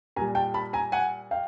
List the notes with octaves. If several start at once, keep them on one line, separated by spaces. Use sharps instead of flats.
A#2 G3 G#5 A#5
G5 A5
A5 B5
G#5 A#5
F#5 G#5
F5 G5